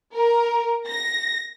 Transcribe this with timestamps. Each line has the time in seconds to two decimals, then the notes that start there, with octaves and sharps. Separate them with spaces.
0.14 A#4
0.88 A#6